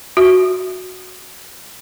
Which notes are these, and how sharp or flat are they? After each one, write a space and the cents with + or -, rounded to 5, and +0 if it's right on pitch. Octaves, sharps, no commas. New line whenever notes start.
F#4 -5